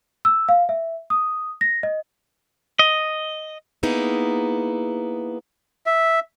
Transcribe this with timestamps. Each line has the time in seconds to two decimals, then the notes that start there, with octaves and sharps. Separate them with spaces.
0.25 E6
0.49 F5
0.69 E5
1.10 D#6
1.61 A#6
1.83 D#5
2.79 D#5
3.83 A#3 B3 D#4 E4 G#4
5.86 E5